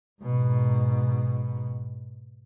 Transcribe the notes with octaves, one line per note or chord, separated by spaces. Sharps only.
G#2 B2